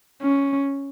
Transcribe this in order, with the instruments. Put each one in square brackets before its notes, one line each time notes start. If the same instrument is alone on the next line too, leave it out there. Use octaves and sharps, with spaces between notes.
[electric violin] C#4